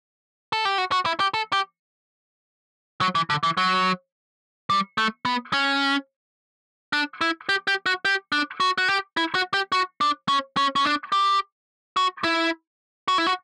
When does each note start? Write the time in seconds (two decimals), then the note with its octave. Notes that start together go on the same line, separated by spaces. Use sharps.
0.53 A4
0.65 G4
0.78 F#4
0.92 F#4
1.06 E4
1.20 G4
1.34 A4
1.53 G4
3.01 F#3
3.15 E3
3.30 D3
3.43 E3
3.57 F#3
4.70 G3
4.98 A3
5.25 B3
5.53 C#4
6.93 D4
7.21 E4
7.49 G4
7.68 G4
7.86 F#4
8.05 G4
8.32 D4
8.60 F#4
8.78 F#4
8.89 G4
9.17 E4
9.35 F#4
9.54 G4
9.72 F#4
10.01 D4
10.28 C#4
10.57 C#4
10.76 C#4
10.85 D4
11.12 G4
11.97 F#4
12.24 E4
13.08 F#4
13.18 E4
13.27 F#4